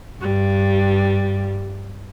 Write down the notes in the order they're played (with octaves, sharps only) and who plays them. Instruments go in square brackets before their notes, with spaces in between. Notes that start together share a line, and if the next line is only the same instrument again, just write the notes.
[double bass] G2 [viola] G3